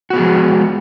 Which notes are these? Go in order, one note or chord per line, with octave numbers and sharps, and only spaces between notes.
F3 G#3 B3 F#4 G#4